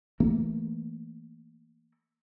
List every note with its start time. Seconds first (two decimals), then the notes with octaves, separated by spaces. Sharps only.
0.20 E3 A3 A#3